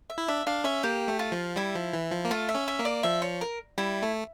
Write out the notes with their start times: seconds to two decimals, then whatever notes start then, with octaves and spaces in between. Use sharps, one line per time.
0.10 E5
0.18 E4
0.28 D4 E5
0.46 D4 F5
0.64 C#4 E5
0.83 A#3 G4
1.08 A3
1.19 F4
1.32 F3
1.56 G3 E4
1.75 F3
1.93 E3
2.12 F3
2.25 A#3
2.30 A3 F4
2.49 E5
2.55 C#4
2.68 E5
2.79 A#3
2.85 D5
3.03 F3 E5
3.22 C#5
3.41 A#4
3.78 G3 E4
4.02 A3